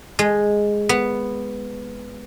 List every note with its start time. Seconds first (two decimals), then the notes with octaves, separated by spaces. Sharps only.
0.19 G#3
0.89 B3